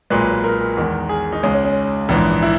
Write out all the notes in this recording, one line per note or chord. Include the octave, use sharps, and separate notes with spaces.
B1 A#2 G#3 B4
A#4
E2 D#3 G#3
G#4
D#4
C#2 C#3 G#3 C#4
C#4
C#4
A#1 G#2 E3
E4